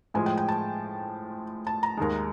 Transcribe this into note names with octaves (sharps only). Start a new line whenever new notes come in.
A2 F3 G#3 G#5
G5
G5
A5
A5
A#5
D#2 D#3 G#3